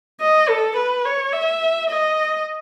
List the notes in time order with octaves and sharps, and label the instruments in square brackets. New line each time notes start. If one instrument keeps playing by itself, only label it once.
[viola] D#5
A4
B4
C#5
E5
D#5